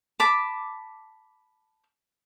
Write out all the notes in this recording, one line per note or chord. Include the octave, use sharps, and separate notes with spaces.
A5 B5 D6